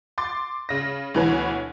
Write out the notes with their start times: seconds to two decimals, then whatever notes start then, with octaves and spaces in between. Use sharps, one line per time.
0.18 C6 D6 A6
0.69 C#3 A#6
1.14 D2 B2 E3 B4 C#5 G#5